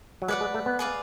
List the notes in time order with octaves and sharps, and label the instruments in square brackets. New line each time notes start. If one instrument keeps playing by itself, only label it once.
[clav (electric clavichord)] F#3
[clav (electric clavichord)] G#3 [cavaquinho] B4 D5 F#5
[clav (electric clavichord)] G#3
A3
B3
[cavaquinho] G#4 B4 D5 F5